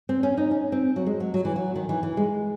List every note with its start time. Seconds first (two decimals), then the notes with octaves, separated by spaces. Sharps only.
0.09 C4
0.23 C#4
0.37 D#4
0.51 C#4
0.72 C4
0.96 F#3
1.06 G#3
1.20 F#3
1.34 F#3
1.45 E3
1.56 F#3
1.76 D#3
1.89 E3
2.03 E3
2.17 G#3